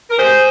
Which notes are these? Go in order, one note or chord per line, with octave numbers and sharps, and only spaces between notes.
A#4
C3 G#4 C5